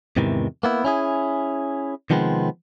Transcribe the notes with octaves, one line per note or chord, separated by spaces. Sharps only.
E2 G#2 C3 D#3 E3
A#3 B3 E4
C#4 E4 G#4
C3 D#3 F3 G#3 B3 C4